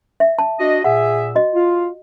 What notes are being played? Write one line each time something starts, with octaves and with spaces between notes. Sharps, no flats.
E5
A5
D4 F#4 D#5
A#2 G#4 E5 F#5
F#4 D#5
F4